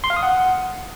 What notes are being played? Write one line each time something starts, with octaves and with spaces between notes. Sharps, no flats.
C6
F5
D#6
F#5